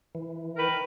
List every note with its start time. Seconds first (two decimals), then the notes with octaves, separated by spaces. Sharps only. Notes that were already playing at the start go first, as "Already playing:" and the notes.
0.15 E3
0.57 D#3 A#4 B4